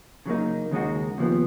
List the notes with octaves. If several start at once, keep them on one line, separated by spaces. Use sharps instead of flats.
C#3 F#3 A#3 D#4
D#2 C#3 G#3 D#4 F#4
D#2 C#3 F3 B3